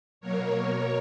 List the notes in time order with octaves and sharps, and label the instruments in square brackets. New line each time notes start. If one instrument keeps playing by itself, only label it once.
[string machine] B2 F#3 A#3 A#4 C#5
B2